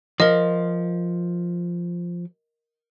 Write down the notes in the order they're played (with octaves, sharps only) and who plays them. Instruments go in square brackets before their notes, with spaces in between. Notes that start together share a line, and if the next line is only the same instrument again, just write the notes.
[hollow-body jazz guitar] F3 [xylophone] A#4 D#5